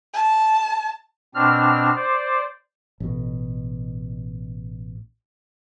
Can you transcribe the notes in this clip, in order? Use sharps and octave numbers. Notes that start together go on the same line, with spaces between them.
A5
B2 C4 D4 F6
C5 D5
A1 B2